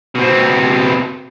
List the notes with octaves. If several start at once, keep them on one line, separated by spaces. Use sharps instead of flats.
B2 C4